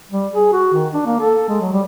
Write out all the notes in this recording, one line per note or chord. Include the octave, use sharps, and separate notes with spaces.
G3
G#4
F#4
D#3
D4
A#3
A4
G#3
F#3
G3